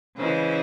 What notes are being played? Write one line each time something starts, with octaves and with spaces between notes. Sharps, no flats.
C#3 E3 G#3 C5